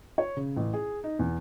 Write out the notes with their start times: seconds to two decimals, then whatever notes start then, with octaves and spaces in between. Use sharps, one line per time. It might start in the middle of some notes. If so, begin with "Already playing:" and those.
0.18 C#5
0.37 C#3
0.57 A1
0.73 G#4
1.04 D#4
1.19 E2